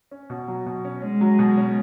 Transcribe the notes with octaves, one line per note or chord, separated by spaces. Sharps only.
C#4
B2
F#3
B2
C#4
G#3 C#4
F#3
B2
C#4